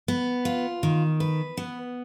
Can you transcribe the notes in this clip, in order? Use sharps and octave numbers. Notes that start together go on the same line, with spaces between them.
B3
F4
D#3
B4
B3